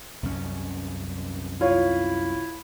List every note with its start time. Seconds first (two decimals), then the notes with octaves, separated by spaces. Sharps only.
0.23 C2 F#2 C#4
1.61 E4 F4 C#5